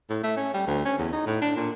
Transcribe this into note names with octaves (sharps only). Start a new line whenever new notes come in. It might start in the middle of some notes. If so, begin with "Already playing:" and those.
A2
A3
C#4
G3
D2
C#4
E2
D#4
A2
D4
A#2